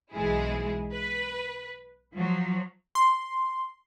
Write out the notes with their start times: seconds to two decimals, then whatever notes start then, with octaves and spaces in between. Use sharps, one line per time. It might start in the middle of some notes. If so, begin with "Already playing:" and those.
0.12 B1 G#2 E3 G#3 E4 G#4
0.92 B4
2.14 F3 F#3
2.95 C6